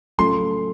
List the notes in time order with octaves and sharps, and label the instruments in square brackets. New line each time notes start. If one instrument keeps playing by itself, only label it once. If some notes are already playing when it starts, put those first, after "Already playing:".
[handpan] F#3 A3 C#4 F4 A4 [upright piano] C6